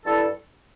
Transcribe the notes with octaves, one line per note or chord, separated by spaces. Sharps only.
G2 G3 E4 A4